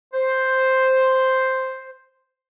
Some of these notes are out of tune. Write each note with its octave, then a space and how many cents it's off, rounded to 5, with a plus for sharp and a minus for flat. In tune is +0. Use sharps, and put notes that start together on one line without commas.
C5 +0